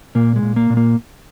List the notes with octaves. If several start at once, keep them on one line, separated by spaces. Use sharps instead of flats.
A#2 A#3
G#3
A#2
A#3
A#2
A#3